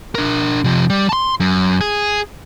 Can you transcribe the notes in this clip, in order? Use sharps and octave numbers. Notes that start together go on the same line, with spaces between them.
D4 A#4
C3 F3
G3
A5 C6
F#2
G#4